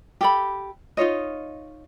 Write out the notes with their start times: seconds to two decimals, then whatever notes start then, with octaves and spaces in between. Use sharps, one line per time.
0.21 G4 A4 B5
0.97 D#4 F4 C#5 D#5